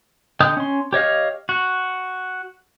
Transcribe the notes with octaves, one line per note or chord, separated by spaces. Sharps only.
D3 D#5 G5 D#6 G6
C#4 C6
G4 C#5 D#5 F5
F#4